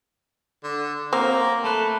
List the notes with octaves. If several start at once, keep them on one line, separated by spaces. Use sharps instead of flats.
D3
F#3 A#3 C4 C5
A3 A5 B5 F#6